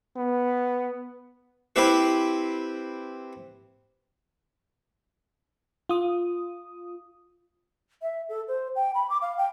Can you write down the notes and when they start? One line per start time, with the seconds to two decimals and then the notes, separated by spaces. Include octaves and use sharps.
0.17 B3
1.76 C4 E4 G4 B4
5.89 F4 D#6
8.02 E5
8.29 A4
8.48 C5
8.76 G5
8.95 B5
9.10 D6
9.22 F5
9.38 G5